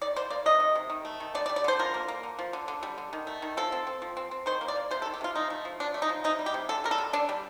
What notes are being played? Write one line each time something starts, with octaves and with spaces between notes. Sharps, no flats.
D#3 D5
A#3 C5
A#3 D5
C3 D#5
D#3
C3
D#3
A3
D#3
D3 D5
D5
G3
D5
D3 C5
F3 A#4
A#3
A#3
D3
F3
D3
D3
G3
D3
D#3
A3
D#3
F3 A4
C4
C4
F3
C4
C4
D#3 C5
A#3
D5
A#3
C3 C5
A4
D#3
G4
C3 F4
F3 D#4
A3
F3
F3 D4
A3
D#4
F3
C3 D#4
G3
G4
C3
D3 A4
G3 A#4
A4
D3
D3 D4
G3